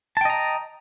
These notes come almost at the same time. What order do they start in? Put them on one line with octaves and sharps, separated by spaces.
A5 G5 D#5 A#5